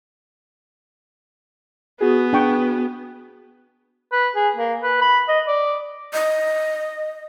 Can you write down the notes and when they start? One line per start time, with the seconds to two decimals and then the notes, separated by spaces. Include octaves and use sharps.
2.01 B3 F#4 G#4
2.33 D4 G5 C#6
4.12 B4
4.36 G#4
4.56 A#3
4.83 B4
5.02 B5
5.28 D#5
5.47 D5
6.13 D#5